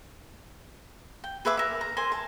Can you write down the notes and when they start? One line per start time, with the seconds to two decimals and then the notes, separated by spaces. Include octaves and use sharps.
1.24 G5
1.45 G#4 B4 E5 D6
1.57 A#4 E5
1.81 A#5
1.97 A#4 C5 G#5 C6
2.12 A5 A#5